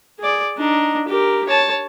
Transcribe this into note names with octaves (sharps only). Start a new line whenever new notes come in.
G#4 D5
D4 D#4
G4 A#4
C#5 A5